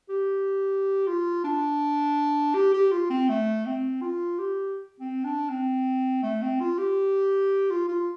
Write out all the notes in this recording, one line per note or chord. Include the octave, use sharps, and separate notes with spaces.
G4
F4
D4
G4
G4
F4
C4
A3
C4
F4
G4
C4
D4
C4
A3
C4
F4
G4
F4
F4